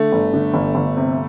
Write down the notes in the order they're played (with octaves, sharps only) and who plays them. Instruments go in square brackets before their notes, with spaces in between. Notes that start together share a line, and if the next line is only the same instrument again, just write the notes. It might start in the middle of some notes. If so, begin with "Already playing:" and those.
Already playing: [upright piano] D3 [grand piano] A3
[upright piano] G1
D3
G1
G1
C3